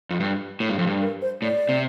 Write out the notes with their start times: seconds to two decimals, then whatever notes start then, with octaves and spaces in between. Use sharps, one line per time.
0.10 F2
0.20 G2
0.60 A2
0.70 G2
0.79 F2
0.87 G2
1.01 A#4
1.22 C5
1.42 A2 D5
1.69 C3